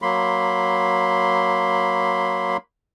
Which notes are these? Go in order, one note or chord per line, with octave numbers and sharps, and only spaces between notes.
F#3 A#3 B5 C6